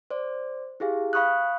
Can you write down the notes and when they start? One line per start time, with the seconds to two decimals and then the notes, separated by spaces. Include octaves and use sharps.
0.11 C5 D5
0.80 E4 G4 G#4 F5
1.13 F5 B5 C#6 D#6 F#6